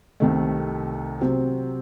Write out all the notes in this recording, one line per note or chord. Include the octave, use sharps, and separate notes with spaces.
C2 C3 D#3 A3
C3 F#3 C4